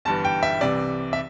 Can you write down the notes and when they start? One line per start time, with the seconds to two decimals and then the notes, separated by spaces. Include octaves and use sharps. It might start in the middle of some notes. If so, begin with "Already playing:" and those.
0.05 G1 G2 E3 A5
0.25 G5
0.43 E5
0.61 C2 C3 E3 D5
1.13 E5